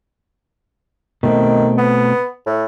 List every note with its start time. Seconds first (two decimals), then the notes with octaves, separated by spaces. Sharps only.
1.23 B2 D#3 A3 C4
1.77 B3
2.46 A2